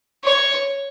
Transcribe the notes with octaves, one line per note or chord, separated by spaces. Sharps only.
C#5